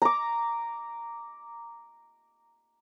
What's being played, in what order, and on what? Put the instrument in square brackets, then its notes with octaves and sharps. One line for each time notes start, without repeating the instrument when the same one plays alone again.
[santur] A#5 D6